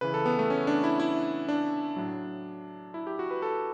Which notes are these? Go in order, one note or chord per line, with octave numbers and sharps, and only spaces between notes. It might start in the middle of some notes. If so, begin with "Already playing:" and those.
C#3 E3 B4
A4
B3
A3
C#4
D4
E4
E4
D4
A2 F#3
E4
G4
F#4
B4
A4